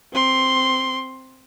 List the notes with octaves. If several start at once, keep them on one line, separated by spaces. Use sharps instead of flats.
C4 C6